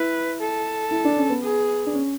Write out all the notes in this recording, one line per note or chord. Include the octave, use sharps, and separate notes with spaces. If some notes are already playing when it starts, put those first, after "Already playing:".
Already playing: E4 B4
A4
E4
D4
C#4
B3
G#4
D4
C#4